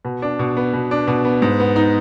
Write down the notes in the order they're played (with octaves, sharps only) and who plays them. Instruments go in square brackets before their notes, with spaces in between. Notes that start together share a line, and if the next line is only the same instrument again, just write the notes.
[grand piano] B2
D4
B2
B3
B2
D4
B2
B3
G#2
B3
D#4